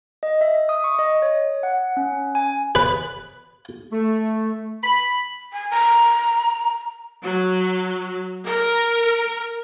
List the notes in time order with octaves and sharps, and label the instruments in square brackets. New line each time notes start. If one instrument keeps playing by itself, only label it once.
[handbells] D#5
E5
D#6
C#6
D#5
C#5
F#5
C#4
G#5
[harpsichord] B4
[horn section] A3
B5
[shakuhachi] G#5
A#5
[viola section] F#3
A#4